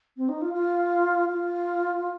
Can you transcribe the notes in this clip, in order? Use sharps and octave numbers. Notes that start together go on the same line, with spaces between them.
C4
D#4
F4
F4
F4